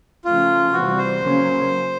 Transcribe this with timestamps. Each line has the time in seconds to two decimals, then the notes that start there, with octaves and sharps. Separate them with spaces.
0.24 C#3 F3 A3 C#4 F4
0.73 C3 E3 G3 C4 F#4
0.98 C5
1.23 C#3 F#3 A#3 C#4